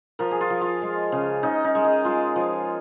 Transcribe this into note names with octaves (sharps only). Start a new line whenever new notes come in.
F3 A#4
G#4
F4
F3
F4
G#3
C#3
C#3 D#4
D#4
G#3
G#4
G#3 F4
F3